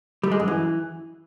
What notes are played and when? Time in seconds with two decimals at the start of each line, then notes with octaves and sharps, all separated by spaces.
0.23 G3
0.32 G#3
0.40 F#2
0.48 E3